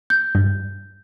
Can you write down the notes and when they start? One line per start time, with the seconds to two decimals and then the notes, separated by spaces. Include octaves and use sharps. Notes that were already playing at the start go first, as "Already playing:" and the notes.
0.10 G6
0.35 G2